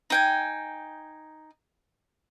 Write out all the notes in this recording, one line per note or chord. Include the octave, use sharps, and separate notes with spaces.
D#4 G5 G#5